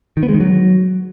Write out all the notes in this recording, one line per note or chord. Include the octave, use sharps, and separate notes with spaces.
D#3
B3
G#3
D#3
F#3